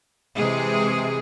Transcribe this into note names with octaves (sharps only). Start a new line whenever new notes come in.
C3 E3 G#3 G#4